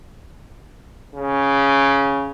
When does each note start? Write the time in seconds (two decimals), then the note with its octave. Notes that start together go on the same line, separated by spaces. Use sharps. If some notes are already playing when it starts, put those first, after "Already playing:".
1.15 C#3